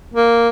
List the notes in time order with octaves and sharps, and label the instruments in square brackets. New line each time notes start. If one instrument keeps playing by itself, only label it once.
[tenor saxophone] A#3